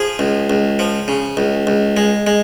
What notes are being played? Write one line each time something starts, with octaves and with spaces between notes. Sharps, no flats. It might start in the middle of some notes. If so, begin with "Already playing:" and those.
Already playing: F3 G#4
C#2
C#2
F3
C#3
C#2
C#2
G#3
G#3